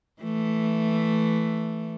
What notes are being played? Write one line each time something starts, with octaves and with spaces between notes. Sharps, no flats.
E3 A3